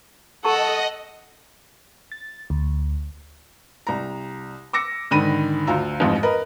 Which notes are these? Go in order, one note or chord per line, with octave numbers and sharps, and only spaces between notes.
A4 D#5 F#5 A5 C#6
A6
D2
C2 A#5
D6 E6 A#6 C#7
G#2 D3 D#3 B5 A#6 D#7
D2 F4 A#5 E6
A1 F2 G#2
A#4 B4 D#5 A#5